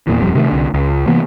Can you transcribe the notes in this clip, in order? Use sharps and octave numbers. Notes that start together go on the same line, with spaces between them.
E2 A#2 E3
D#1 F2 G3
C3 D#3 G#3 A3
C2 D3
C#2
C3 E3 A#3 B3